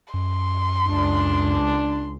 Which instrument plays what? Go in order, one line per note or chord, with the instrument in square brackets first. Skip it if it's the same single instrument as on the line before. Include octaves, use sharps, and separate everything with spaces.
[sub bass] F#2 [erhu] C6
[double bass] C#2 [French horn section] D4